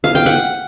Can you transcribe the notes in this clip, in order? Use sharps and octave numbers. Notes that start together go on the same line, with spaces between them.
F5
G5
F#5